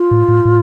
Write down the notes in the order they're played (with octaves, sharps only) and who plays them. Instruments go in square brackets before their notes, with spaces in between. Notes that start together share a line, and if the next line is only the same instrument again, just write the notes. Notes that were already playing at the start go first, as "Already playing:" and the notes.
Already playing: [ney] F4
[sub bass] A2
A2
A2